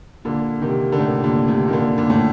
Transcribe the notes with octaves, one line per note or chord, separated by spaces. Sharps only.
A#2 D3
C3 D#3
D3
A2 C3
A#2 D3
A2 C3
D#3
A#2 D3
A#2 D3
A2